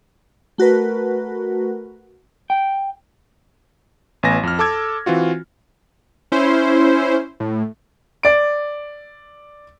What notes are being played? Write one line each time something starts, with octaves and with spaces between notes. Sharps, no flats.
A3 F#4 A#4 B4
G5
A1 B3 G#5 A#6
F2 F6
A4 A5 D6 E6 G#6
E3 C4 F4 F#4
C#4 E4 C5
A2
D5 D7